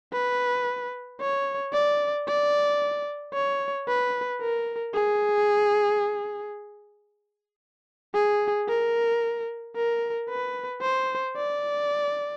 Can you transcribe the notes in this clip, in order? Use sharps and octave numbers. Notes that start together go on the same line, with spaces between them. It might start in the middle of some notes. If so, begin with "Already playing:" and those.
B4
C#5
D5
D5
C#5
B4
A#4
G#4
G#4
A#4
A#4
B4
C5
D5